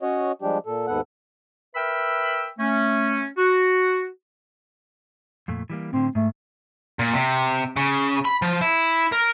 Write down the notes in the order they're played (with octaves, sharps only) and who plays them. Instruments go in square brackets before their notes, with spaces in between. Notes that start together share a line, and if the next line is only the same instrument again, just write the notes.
[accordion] C#4 F#4 C#5 D#5
F3 G3 G#3 D4 G4
A#2 A4
D#2 G#2 B3 A4 F#5
[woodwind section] A#4 B4 E5 G5 B5 E6
A3 C#4
F#4
[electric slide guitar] F2 A#2 A3
E3 G3 A#3
[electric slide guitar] A2 D3 [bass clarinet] C4
[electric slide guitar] G#2 [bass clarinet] A3
[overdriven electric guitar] A#2
C3
C#3
B5
F3
E4
A#4